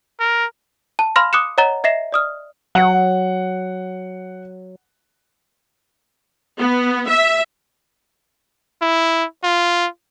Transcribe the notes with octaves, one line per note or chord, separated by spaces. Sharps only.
A#4
A5
F5 B5 C6 F6 A#6
D6 D#6 F#6 C#7 E7
C#5 D#5 F#5 A#5 A6 G7
D#5 E5 A#6 C7 E7
D5 D#6 F6
F#3 F#5
B3
E5
E4
F4